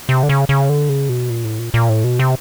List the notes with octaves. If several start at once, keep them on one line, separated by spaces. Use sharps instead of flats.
C3
D3
C#3
C#3
D3
C#3
B2
A#2
A2
A#2
A#2
A2
B2
C3